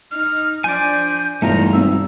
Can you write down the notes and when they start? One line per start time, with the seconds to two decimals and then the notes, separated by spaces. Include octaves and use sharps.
0.11 D#4 F6
0.64 F3 D4 D5 G#5 G6
1.42 E1 G2 B2 A3 D#4 F4 A#5
1.73 G#1 E6